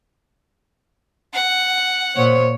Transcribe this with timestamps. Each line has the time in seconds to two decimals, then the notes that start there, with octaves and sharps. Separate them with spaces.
1.33 F#5
2.16 A#2 C5 C#5